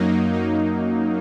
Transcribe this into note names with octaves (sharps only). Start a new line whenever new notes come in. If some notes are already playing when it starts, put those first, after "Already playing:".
Already playing: F#2 F#3 A#3 D#4
D#4